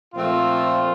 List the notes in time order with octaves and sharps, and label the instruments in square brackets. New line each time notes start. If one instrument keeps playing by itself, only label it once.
[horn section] A#2 F3 A3 C4 F4